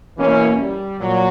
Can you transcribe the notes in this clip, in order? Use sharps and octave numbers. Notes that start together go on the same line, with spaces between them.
B2 E3 A#3 C#4 E4
G3
A#2 F#3